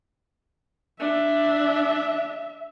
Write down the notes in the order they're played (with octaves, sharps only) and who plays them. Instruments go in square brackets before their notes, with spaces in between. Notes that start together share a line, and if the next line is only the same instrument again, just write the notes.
[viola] D4 [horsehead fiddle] E5